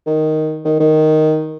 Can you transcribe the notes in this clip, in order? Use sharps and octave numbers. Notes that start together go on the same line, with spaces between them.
D#3
D#3
D#3